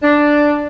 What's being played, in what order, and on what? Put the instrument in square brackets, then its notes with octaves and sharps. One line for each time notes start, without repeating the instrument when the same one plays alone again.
[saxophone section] D4